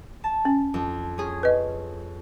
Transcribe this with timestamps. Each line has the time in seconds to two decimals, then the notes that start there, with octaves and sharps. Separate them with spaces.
0.24 A5
0.45 C#4
0.74 F2
1.18 C#4 G#4
1.43 B4 D#5